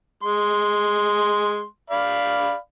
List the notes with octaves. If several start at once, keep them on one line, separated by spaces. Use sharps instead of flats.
G#3 C6
D5 F5 B5